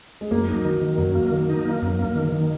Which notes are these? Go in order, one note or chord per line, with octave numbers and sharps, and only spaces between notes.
G#3
F#2 A#3
D#4
F#3
D#3
D#3
F#2 F#3
A#3
D#3
D#4
A#3
F#2
A#3
D#3
D#3